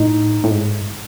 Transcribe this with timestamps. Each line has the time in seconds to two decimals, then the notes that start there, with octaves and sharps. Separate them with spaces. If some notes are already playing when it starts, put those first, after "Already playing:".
Already playing: A2 D#4
0.44 A2
0.51 G#2